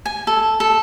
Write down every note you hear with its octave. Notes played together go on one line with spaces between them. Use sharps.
G#5
A4
A4